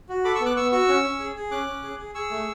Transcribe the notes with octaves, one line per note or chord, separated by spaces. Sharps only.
F#4
A4 B5 D6
C#6 E6
B3
D6 F#6
B3 C#6 E6
F#4 C#6 E6
C#4
C#4
G#4
G#4
C#4 D6 F#6
C#4
G#4
G#4
G#4 C#6 E6
A3